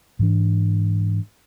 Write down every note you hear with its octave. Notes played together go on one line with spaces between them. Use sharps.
G#2 E3 D4